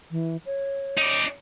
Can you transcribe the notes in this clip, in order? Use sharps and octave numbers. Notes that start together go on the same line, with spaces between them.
E3
C#5
D#4 D5